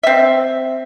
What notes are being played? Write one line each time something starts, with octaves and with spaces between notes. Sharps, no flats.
C4 E5